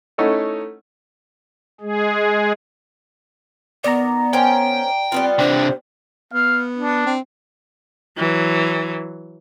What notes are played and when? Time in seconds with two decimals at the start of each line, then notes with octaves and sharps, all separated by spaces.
0.18 A3 C#4 D#4 E4 A4 F#5
1.81 G#3 G#4
3.84 D#3 B3 D5 A#5
4.33 C#4 A#4 C5 G5
5.12 G3 B3 C4 F4
5.39 C3 D4 C5
6.33 B3 F5
6.78 D4
7.06 C4
8.17 E3 F#3